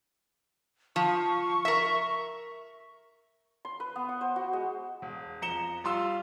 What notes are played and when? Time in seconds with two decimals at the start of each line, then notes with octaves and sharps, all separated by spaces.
0.96 F3 C#6
1.65 A#4 E5
3.65 C6
3.80 B4
3.96 B3
4.09 F#5
4.21 C5
4.36 F#4
4.53 G#3
5.02 E1
5.42 F2 A#5 C#7 E7 G7
5.84 G3 F4 C6 E6